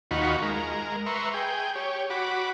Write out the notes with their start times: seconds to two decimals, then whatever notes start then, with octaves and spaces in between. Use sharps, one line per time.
0.11 D#2 D#4 F4 F#4 B5 C#6
0.42 G#3 A#4
1.06 B4 E5 A#5 C6 C#6
1.34 G#4 G5
1.75 G4 C#5
2.10 F#4 B5 D6